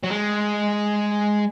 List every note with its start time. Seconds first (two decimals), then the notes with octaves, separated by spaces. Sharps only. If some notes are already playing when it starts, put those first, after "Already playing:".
0.04 F#3
0.11 G#3